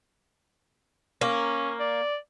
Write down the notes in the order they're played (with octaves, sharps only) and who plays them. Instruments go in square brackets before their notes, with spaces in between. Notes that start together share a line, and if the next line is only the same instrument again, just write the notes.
[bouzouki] A#3 [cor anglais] C#4
[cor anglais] D5